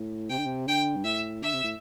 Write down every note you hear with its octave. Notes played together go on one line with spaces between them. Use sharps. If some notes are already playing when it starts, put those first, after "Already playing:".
Already playing: A2
C3 G5
D3
C3
D3 G5
G2
A2 E5
D3 E5
C3
A2